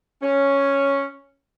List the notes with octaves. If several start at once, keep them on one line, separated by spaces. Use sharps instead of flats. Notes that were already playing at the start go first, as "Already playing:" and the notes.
C#4